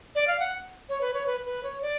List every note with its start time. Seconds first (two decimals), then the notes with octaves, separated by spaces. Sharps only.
0.15 D5
0.27 F5
0.39 F#5
0.89 C#5
1.01 B4
1.14 C#5
1.26 B4
1.46 B4
1.63 C#5
1.82 D5